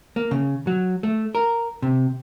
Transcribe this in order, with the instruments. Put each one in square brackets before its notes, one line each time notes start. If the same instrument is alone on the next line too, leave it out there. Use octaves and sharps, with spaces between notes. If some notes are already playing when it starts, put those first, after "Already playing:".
[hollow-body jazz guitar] A#3
C#3
F#3
A3
A#4
C3